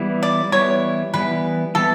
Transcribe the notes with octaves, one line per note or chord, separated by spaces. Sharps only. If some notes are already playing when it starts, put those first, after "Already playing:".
Already playing: E3 G3 B3 E4
D5
E3 G3 B3 E4 C#5
E3 G3 B3 E4 B4
E3 G3 B3 E4 A4